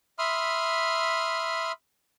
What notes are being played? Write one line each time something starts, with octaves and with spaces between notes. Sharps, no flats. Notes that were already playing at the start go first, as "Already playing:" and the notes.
E5 B5 C6 D#6 F6